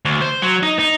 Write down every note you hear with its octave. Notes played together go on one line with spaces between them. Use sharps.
D2
C5
F#3
D#4
D#4